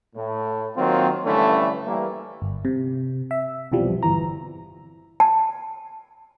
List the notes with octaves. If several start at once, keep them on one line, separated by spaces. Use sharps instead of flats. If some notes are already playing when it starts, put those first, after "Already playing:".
A2
D#3 F#3 A#3 C4 F4
G2 D3 E3 A3 C#4
E3 G3 A#3
G1
C3
E5
B1 E2 C3 E3 F3 G3
G1 E2 E3 A#5
A5